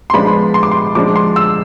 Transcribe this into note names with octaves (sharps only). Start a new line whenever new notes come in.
C6
F3 G#3 B3 D4 F4 B5
C6
D6
C6
F3 G#3 D4 D6
C6
E6